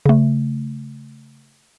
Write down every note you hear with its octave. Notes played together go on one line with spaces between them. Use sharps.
C#3 A3